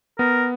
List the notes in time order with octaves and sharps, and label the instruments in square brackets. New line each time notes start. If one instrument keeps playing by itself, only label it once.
[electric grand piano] B3 [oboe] A#4